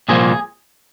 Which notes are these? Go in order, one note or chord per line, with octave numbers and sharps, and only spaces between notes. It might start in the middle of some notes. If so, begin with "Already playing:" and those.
C2 A#2 F3 G#4